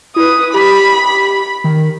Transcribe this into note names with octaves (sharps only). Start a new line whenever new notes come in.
E4 B4 D#6
G4 B5
D#3